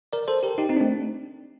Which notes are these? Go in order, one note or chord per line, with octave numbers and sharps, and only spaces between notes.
A#4 D5
A4 C5
G4 A#4
D#4 G4
C4 D#4
D4
A3 C4